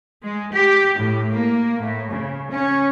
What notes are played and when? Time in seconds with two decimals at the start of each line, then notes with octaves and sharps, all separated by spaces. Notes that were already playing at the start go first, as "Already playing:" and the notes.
0.23 G#3
0.53 G4
0.98 A2
1.33 A#3
1.81 A2
2.13 C#3
2.52 C#4